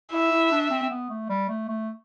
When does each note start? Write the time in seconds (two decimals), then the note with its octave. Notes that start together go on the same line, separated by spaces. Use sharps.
0.12 E4 E5
0.31 E4
0.51 D4
0.70 C4
0.83 C4
0.90 B3
1.09 A3
1.29 G3
1.49 A3
1.68 A3